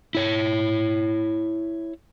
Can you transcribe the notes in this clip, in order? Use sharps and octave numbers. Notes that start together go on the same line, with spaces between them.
E4 C#5